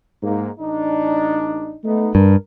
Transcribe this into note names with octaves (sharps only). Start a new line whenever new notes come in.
G#2 A#3
A1 D4 D#4
A3 B3 D#4
G2 A#4